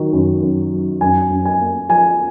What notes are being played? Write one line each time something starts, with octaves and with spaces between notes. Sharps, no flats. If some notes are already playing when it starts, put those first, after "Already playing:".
Already playing: D#3 F#3
F#2
F#2
F#3
F#2 G#5
F#2
G#5
A#3
F3 G#5